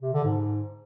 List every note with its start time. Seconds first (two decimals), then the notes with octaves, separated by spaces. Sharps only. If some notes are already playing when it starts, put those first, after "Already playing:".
0.02 C3
0.13 D3
0.24 G#2